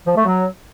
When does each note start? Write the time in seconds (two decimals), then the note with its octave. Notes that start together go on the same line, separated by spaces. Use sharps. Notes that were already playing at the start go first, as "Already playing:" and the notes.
0.06 F3
0.16 A3
0.25 F#3